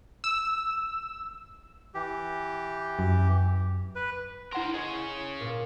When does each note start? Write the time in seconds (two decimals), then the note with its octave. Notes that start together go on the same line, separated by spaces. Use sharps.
0.24 E6
1.95 E3 G4
2.99 F#2
3.96 B4
4.52 E4 A#4 C5 F#5 C6
4.74 G#4 C#5 D#5
5.40 A#2